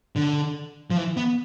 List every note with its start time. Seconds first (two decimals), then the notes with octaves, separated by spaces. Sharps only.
0.16 D3
0.90 F3
0.97 E3
1.17 B3